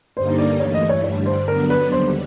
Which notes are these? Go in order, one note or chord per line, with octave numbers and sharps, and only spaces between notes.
G2 D3 G3 A#3 D#4 C5
D5
G2 E3 A3 C#5
D#5
C#5
G2 D3 G3 C#5
C5
D3 F#3 B3 D4 A#4
B4
D#2 D3 G3 C5